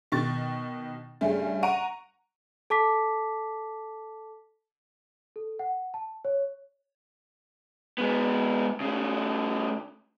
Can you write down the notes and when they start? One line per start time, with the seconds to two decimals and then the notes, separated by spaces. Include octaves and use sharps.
0.12 B2 D#3 C#6 A6
1.21 G2 C#3 A3 C#4
1.63 F#5 A#5 C#6 D7 D#7
2.70 A4 A5 D6 B6
5.36 A4
5.59 F#5
5.94 A5
6.25 C#5
7.98 G#3 B3
8.80 C#3 A3